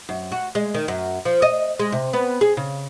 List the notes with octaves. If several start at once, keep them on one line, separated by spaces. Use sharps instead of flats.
F#2
F#4
G#3
D#3
F#2
F3
D#5
G#3
C3
B3
G#4
C#3